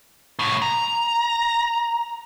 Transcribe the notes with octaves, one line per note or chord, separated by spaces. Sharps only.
C2 A2
A#5